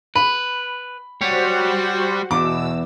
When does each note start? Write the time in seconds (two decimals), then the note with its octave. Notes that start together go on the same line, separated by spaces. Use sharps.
0.16 B4 B5
1.21 G3 F#4 C5 C#5 F#5
2.31 E2 B2 D6 E6